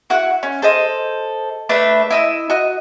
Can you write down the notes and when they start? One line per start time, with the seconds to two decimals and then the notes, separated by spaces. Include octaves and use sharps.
0.10 E4 F#4 F#5 F#6
0.43 C#4
0.62 A4 C5 D#5
1.69 A3 D4 B4 E5
2.11 E4 D#5 E6
2.50 F#4 D#5